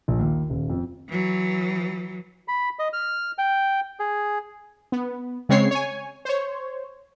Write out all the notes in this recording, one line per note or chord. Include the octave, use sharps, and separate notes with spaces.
A#1
D#2
D#1
F2
E3 F#3
B5
D#5
F6
G5
G#4
B3
C#3 G#3 C4 C#5 C7
C#5 G#5
C5 C#5